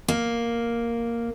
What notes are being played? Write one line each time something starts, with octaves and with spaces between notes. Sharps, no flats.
A#3